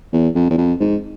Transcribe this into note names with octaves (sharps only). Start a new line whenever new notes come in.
E2
F2
E2
F2
G#2